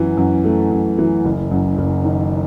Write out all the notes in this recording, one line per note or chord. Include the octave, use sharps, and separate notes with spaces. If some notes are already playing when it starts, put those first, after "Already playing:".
Already playing: F#2 E3
F#2
A3
F#2
E3
F#1
F#2
F#1
D#3